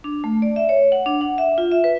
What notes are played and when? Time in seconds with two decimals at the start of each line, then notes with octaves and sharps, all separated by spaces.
0.04 D4
0.24 A3
0.42 D5
0.56 E5
0.69 C#5
0.92 F#5
1.06 D4
1.21 F#5
1.38 E5
1.58 F4
1.72 E5
1.84 B4